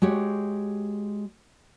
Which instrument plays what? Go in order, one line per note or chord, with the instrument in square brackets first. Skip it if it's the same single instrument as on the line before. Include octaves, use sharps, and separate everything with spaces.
[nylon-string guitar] G#3 F#4 G4 C#5